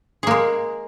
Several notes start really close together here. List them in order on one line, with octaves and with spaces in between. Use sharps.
G#4 A#3 G#3